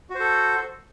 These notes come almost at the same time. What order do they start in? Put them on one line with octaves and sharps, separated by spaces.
F#4 C5 A4